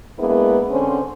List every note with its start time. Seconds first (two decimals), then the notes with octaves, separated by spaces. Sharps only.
0.19 G#3 A#3 B3 D4 E4 G#4
0.70 D3 C4 C#4 C5